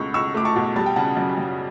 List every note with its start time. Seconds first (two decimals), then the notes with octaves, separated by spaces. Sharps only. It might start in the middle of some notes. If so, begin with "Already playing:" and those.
Already playing: C#2 B2 A3 C#6
0.14 C#2 C#6 E6
0.34 A3 D6
0.45 A5 C#6
0.56 B2
0.76 G3 A5
0.86 G5
0.96 C#3 F#5 A5
1.17 F#2
1.38 F#2